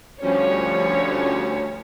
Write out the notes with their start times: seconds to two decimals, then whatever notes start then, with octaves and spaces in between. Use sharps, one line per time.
0.21 D2 F3 G3 C#4 C#5